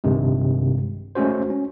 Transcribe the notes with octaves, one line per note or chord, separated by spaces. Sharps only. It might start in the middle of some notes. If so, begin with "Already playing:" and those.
A#1 G2 C3 D#3 G#3
G#3 A3 C#4 F#4 C5
C#4